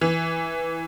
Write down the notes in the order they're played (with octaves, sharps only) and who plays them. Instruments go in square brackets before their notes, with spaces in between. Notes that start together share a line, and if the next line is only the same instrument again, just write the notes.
[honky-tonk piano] E3